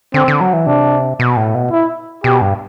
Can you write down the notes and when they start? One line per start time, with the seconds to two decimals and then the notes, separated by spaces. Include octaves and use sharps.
0.14 D3 C4
0.28 D3
0.41 F#3
0.53 E3
0.67 C3 D4
1.19 B2
1.37 A2
1.54 B2
1.71 E4
2.24 B2 G4
2.41 G2